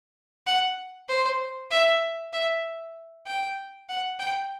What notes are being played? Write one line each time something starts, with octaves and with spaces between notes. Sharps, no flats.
F#5
C5
E5
E5
G5
F#5
G5